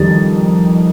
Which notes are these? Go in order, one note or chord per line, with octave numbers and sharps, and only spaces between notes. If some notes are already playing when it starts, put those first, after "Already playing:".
Already playing: F2 D#3 G3 A6